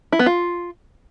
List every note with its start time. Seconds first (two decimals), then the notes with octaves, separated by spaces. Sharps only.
0.12 E4
0.19 B3
0.26 F4